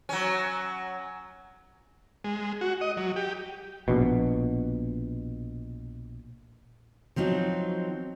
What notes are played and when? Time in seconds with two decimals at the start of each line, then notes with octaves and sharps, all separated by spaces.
0.09 F#3 C#4
2.24 G#3
2.61 F#4
2.81 D#5
2.97 F#3
3.16 G4
3.88 A#1 B2
7.16 F3 F#3 C4 D#4